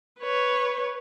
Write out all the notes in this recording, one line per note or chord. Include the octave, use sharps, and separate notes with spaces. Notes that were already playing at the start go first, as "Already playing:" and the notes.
B4 C#5